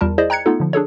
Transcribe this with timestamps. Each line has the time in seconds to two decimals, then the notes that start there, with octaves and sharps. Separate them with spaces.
0.01 E2 G3 F4 A#4 A5
0.18 E4 G#4 C5 D5 D#5
0.30 G5 A#5 F#6 G#6 C#7
0.46 A3 B3 D#4 F4 A4
0.60 D3 F3
0.73 D4 G#4 A4 C#5